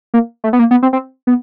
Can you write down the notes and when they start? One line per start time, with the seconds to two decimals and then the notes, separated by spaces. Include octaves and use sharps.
0.14 A#3
0.44 A3
0.53 B3
0.59 A#3
0.71 B3
0.83 C4
0.93 C4
1.27 B3